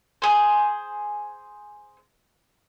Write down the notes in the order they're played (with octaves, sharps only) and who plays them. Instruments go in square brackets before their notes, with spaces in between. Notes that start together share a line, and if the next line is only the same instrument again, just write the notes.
[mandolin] G#4 C5